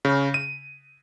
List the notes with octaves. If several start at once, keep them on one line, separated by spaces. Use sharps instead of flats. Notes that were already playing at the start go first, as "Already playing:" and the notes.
C#3
D#7